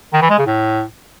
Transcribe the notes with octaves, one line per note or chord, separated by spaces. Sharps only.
D#3
E3
G#3
C#3
A2